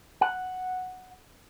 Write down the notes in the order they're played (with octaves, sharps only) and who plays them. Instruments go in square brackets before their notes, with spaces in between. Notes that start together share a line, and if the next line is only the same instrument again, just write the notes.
[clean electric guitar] F#5